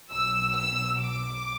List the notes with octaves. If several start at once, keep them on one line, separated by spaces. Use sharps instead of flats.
B1 B2 F#3 E6
E6
D6